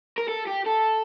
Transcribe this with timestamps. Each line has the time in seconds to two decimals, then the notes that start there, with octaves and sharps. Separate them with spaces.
0.18 A#4
0.28 A4
0.47 G4
0.66 A4